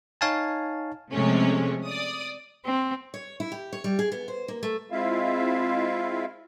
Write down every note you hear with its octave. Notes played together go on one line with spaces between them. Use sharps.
D#4 C#5 F5 G#5 A5
C3 F3 G#3 A3 C#4
D5 D#6
C4
C#5
E4
G4
C#5
G3
G#4
B3
C5
A#3
A3
G#3 C4 E4 F4 E5 F5